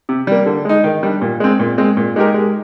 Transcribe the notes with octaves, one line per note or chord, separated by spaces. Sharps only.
C3
G3 A#3
D3
G#3 D#4
D#3
G3 D4
A#2
G#3 C4
A#2
G#3 C4
A#2
G#3 D#4 G4 A#4
G#3